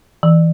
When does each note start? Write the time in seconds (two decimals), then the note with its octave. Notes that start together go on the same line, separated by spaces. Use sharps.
0.23 E3